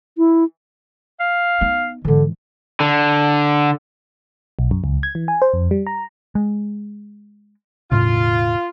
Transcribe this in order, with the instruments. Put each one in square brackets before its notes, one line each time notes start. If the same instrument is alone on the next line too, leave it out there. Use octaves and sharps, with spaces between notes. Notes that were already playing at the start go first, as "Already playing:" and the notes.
[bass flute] E4
[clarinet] F5
[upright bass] B3 D#4
[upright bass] G#2 E3 [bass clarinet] D3
[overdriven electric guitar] D3
[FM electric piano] B1
F#2
C#2
G#6
E3
G#5
C5
F2
G3
A#5
[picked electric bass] G#3
[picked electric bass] E1 A2 C#3 [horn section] F4